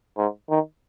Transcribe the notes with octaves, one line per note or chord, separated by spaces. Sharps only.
G#2
D#3